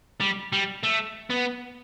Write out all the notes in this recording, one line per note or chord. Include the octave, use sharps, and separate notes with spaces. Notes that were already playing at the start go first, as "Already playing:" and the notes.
G3
G3
A3
B3